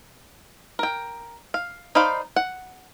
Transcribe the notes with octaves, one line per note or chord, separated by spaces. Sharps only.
A#4 G5
F5
D#4 B4 C5 D5 F5
F#5